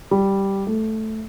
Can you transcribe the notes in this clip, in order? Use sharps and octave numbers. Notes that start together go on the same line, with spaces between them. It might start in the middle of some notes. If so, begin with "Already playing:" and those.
G3
A3